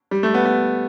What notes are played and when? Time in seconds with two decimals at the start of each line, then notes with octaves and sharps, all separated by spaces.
0.11 G3
0.23 A3
0.34 B3
0.45 B3